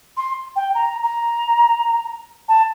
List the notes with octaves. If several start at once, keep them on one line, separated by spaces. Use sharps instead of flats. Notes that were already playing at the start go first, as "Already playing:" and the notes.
C6
G5
A#5
A#5
A5